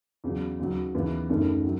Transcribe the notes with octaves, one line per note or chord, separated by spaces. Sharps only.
E2 C#3 F#3
D#2 C#3 F#3
D#2 C#3 E3 B3
F#1 F#2 D#3 A3 C#4
F#3